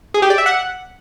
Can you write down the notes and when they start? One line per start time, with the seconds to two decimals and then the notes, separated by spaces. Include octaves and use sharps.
0.14 G#4
0.22 G4
0.30 D5
0.38 E5
0.46 F#5